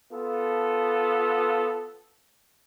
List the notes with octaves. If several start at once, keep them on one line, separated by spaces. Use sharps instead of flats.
B3 F4 A4